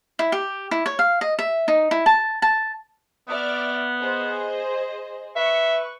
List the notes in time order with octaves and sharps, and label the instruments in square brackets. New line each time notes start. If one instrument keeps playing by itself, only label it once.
[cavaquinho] E4
G4
E4
C#5
F5
D#5
E5
D#4
E4
A5
A5
[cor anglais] B3 [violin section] D5 E5 F6
[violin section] G#4 C5 D#5
[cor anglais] B4 [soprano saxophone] E5 [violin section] C#6